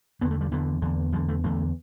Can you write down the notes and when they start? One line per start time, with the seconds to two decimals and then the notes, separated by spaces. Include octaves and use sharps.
0.21 E2 B3
0.25 D3
0.31 A3
0.41 G3
0.51 E2 D3 E3
0.82 E2 D3
1.12 E2 D3 G3
1.29 A3
1.44 E2 D3 A3